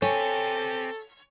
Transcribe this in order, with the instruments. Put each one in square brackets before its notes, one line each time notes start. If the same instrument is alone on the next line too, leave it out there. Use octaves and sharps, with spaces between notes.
[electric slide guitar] C4 G4 [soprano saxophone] A4 [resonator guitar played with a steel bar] C#5 [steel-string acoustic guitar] G#5